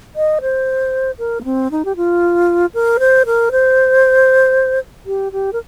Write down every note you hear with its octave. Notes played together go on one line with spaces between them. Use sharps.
D#5
C5
A#4
A#3
C4
D#4
G4
F4
A#4
C5
A#4
C5
G4
G4
A#4